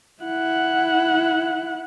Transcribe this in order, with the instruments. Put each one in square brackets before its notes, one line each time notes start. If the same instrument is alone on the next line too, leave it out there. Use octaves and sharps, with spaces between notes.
[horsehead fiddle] E4 F#5